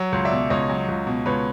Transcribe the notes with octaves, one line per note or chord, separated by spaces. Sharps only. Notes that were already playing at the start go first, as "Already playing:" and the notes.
Already playing: F#3
C#2
D5 E5
B2
C#2 C#5 D#5
F#3
C#2
B2
C#2 B4 C#5